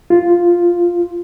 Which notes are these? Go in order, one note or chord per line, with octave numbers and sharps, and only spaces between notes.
F4